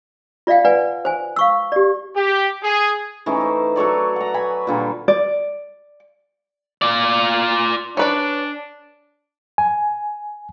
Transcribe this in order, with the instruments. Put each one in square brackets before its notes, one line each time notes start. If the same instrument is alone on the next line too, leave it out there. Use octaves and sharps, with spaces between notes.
[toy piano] F4 D5 E5 F5 G5
B4 D5 F#5 G#5
C5 G#5
F5 C#6 E6
G4 D5
[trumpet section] G4
G#4
[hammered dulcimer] E3 A3 C#4 D#4
C5
F#3 A4 C#5 D5
F#5 A#5
B4 G#5 B5
A#2 D3 G3
[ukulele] D5
[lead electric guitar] F4 D5
[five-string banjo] C#4 B4 D5 [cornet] D4
[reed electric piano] G#5